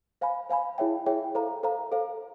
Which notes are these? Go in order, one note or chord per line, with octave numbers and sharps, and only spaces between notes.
C5 F5 G#5 B5
C5 F5 G#5 B5
E4 G#4 C#5 E5 G5
E4 G#4 C#5 E5 G5
A4 C5 F5 A#5
A4 C5 F5 A#5
A4 C5 F5